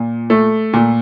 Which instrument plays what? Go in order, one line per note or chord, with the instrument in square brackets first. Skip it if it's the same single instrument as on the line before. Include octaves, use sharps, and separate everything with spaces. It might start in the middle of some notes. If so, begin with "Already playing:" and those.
Already playing: [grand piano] A#2
A3
A#2